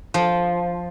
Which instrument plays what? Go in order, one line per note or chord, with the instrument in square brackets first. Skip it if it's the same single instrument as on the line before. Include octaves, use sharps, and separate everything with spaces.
[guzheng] F3